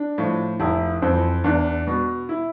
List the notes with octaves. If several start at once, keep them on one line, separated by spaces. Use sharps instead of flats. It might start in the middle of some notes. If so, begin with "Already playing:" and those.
Already playing: D4
A2 F3
F1 E4
F2 E3 C4
E2 D4
B2
E4